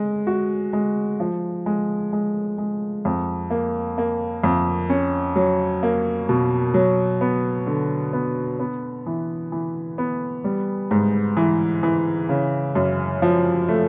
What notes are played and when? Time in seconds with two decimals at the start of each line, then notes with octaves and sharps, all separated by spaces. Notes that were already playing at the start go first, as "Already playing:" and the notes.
Already playing: G#3
0.27 F#4
0.73 G#3
1.20 F3
1.66 G#3
2.13 G#3
2.58 G#3
3.05 F2
3.50 A#3
3.98 A#3
4.44 F2
4.89 C#4
5.36 F#3
5.83 A#3
6.29 B2
6.74 F#3
7.21 B3
7.67 D3
8.13 B3
8.60 B3
9.06 E3
9.52 E3
9.98 B3
10.44 G3
10.91 G#2
11.37 E3
11.83 E3
12.29 C#3
12.75 F#2
13.22 F3
13.69 A3